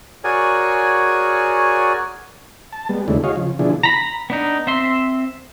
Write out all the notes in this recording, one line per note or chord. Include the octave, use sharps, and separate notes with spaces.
F#4 G#4 A#4 C#5 D5 G#5
A5
G3 G#3 B3
D#2 C#3 G#3 A3 D4 E4
F#4 G#4 C#5 D#5 F5
C#3 F3
B2 D3 F3 D4 E4 G#4
A#5 B5
B3 D4 D#4
C4 E5 C6